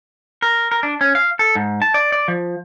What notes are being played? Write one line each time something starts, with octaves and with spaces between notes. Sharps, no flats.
A#4
A#4
D4
C#4
F5
A4
G#2
A5
D5
D5
F3